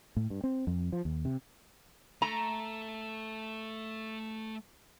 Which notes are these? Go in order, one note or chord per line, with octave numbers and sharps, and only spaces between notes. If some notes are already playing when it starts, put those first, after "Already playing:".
A2
G2
C4
F2
F3
D#2
C3
A3 A#5